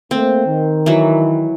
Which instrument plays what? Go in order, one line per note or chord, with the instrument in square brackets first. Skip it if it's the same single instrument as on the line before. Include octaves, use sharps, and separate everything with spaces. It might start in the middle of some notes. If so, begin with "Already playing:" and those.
[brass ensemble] A3 A#3 [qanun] C4
[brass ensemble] D#3
[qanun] E3 F#3